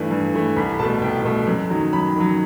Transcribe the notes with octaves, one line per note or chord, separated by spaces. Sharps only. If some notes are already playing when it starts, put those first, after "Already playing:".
Already playing: G2 E3 A3
G2
E3 A3
C2 B5
B2 A3 A5
C2 G5
B2 A3
F#2
D#3 F#3
F#2 B5
D#3 F#3